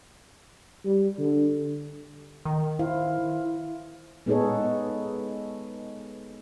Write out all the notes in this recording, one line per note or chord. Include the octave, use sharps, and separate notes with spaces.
G3
D3
D#3
E4 C5 F5
G#3 B3 D#4 G#4 A4 C#5